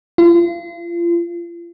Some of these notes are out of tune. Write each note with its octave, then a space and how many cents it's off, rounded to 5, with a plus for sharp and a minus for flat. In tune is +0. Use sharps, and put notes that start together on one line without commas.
F4 -35